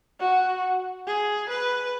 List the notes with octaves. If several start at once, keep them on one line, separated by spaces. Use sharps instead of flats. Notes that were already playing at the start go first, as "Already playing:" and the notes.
F#4
G#4
B4